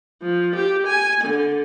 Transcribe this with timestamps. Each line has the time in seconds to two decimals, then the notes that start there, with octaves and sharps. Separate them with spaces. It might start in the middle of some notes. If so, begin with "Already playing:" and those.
0.22 F3
0.55 G4
0.86 G#5
1.24 D3